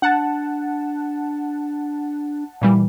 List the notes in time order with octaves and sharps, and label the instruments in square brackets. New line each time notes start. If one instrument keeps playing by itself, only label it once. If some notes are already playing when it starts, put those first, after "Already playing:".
[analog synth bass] D4 [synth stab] F#5 A5
[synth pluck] A#2 E3 G3